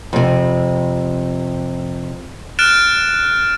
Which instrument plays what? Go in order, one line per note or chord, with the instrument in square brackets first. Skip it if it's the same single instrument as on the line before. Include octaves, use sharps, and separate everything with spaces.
[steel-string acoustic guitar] F2 C3
[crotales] F6 F#6 A6 D7 E7